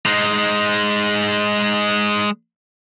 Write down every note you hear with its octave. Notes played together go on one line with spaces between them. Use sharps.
G#3 D#4